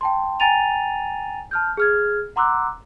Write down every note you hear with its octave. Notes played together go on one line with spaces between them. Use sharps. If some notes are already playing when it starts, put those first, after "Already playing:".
G5 A5 C6
G5 G#5 A#5 A6 D#7 F7
A5 F6 G6
G#4 F6 G#6
F#5 A#5 C6 D6 E6 F#6